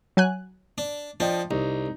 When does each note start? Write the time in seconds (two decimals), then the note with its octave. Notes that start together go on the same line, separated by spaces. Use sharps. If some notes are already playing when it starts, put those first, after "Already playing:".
0.17 F#3 G#5 F#6
0.78 D4
1.20 F3 D4 D#5 G5
1.51 C2 D#4